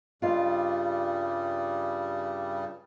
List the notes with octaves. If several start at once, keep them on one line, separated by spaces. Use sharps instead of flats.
G2 C#3 G3 F4 D#5 F5